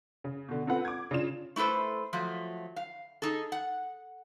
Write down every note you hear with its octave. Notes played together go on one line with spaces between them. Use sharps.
C#3
B2 D3
C4 F4 A4 B4 F#5
D6 G#6
C#3 D4 F4 E7
A3 E4 A4 B4 C5
F3 F#3 A3
F5
D#4 G#4 A4
F#5